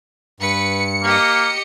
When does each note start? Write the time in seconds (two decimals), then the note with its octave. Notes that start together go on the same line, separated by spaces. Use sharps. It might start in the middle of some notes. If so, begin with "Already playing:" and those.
0.40 G2 B4 C#7
1.04 A#3 G4 D#5